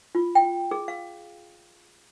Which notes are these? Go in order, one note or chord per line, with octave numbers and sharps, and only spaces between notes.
F4
G5
G#4
F5